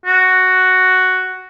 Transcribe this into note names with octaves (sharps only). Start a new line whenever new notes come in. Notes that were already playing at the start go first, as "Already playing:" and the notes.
F#4